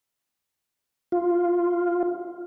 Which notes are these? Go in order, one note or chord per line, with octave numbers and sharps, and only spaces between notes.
F4